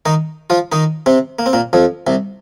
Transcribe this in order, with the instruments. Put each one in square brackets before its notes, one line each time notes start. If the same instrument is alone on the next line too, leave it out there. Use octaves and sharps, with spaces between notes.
[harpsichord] D#3 D#4
F3 F4
D#3 D#4
C3 C4
A#3
C4
A#2 A#3
F2 F3
C2 C3